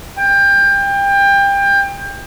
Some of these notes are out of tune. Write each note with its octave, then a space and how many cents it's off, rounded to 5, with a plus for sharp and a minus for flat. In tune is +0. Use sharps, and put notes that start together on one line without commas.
G5 +25